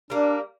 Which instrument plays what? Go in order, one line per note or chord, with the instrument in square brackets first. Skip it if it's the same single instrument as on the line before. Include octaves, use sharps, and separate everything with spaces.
[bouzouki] G3 A#3 [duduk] D4